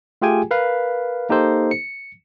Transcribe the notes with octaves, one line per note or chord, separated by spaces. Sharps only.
A3 F4 G4 G#4 G5 G#5
A#4 B4 F5
A#3 D#4 G4 A4 C5
C#7